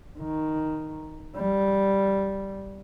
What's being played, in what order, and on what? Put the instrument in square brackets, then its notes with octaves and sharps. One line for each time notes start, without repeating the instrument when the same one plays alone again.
[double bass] D#3
G3